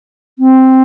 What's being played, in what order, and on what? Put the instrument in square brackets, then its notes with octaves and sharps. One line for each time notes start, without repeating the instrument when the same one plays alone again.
[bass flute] C4